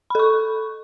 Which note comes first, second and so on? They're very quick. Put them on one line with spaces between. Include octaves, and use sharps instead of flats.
B5 A4 C#6